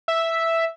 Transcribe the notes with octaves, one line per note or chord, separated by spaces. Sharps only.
E5